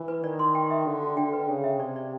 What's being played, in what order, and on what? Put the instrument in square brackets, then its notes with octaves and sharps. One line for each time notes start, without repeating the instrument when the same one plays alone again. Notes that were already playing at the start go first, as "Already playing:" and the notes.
Already playing: [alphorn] E3
[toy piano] B4
[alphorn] D#3 [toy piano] D5
[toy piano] C6
G5
E5
[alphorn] D3 [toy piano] F#4
[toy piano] F#4
[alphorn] D3 [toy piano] G5
[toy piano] B4
[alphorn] C#3 [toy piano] G5
[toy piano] E5
[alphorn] C3 [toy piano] D5
[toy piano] D5